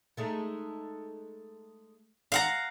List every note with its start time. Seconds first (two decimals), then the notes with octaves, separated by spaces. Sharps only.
0.17 G#3 A3 D#4
2.32 F5 F#5 A#5